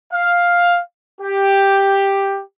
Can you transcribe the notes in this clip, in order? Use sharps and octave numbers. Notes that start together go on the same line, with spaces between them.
F5
G4